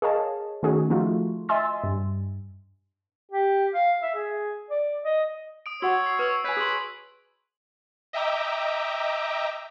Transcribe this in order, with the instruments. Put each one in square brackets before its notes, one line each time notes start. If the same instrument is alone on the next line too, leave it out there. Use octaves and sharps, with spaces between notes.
[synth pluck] G#4 A#4 C#5 D#5 F5 A5
D#3 A3 C#4 D#4 F#4 G#4
F3 A3 D#4 F4 F#4
D#5 E5 G#5 C6 E6 A6
G2
[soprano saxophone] G4
F5
E5
G#4
D5
D#5
[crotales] D#6 D7
[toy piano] F#4 F#5 D6 [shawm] C#5 [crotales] E6
[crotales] E6 C7
[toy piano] B4 [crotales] C#6 D#6 E6
[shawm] B4 [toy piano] C#5 G#5 [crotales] G#6
[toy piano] G#4 C6 [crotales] D#6 F#7
[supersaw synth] D#5 E5 G5 A#5 D6